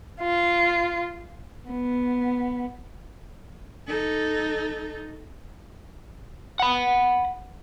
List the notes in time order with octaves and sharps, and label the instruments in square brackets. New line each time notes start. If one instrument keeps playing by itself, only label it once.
[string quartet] F4
B3
[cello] D#4 A4
[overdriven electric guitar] F#5 B5